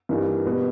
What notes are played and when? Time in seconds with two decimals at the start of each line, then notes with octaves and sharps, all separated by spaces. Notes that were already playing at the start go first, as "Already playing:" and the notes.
0.09 G2 E3 G3 A#3 D#4
0.45 B2 G3 B3